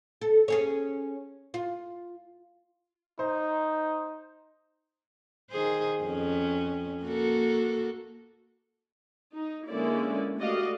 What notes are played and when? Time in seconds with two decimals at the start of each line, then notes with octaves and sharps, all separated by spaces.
0.21 A4
0.48 C#4 G#4 C#5
1.54 F4
3.19 D#4 C5
5.50 D#3 G#4 C5
6.03 F2 C#4
7.03 A#3 F#4 A4
9.36 D#4
9.67 D3 G#3 A#3 C#4 E4 D5
10.38 A3 F#4 G4 D5 D#5 F5